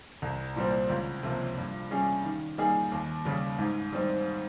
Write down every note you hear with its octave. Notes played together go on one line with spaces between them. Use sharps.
C2
A#2 G3 C4
C#2
C3 F3 A#3
G2
G3 C#4 G#4
D#3
G3 A#3 D#4 G#4
D#2
C#3 G3
G#2
G3 C4 D#4